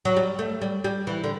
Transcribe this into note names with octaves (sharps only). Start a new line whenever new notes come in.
F#3
G3
A3
G3
G3
E3
D3